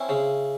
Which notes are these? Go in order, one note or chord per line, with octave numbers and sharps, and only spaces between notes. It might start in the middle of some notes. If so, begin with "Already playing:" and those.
Already playing: C4 C#4 E4
C#3